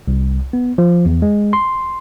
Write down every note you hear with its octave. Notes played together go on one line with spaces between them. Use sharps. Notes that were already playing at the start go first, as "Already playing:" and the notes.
C2
B3
F3
E2
G#3
C6